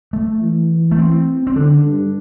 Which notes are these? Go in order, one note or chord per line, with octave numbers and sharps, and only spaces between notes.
A3
E3
A3
C4
C4
D3 D4
G2